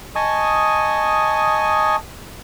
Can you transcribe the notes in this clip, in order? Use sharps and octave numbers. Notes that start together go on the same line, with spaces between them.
D#5 G#5 A5 C#6 D#6